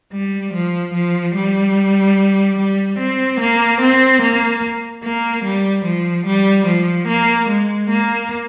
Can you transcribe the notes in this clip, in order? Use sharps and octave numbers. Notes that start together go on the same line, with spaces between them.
G3
F3
F3
G3
G3
C4
A#3
C4
A#3
A#3
G3
F3
G3
F3
A#3
G#3
A#3